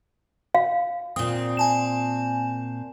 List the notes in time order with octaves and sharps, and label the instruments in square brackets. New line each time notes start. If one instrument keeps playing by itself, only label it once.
[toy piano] F5
[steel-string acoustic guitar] A#2 C4 [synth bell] D#6
[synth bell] G#5 A5 E7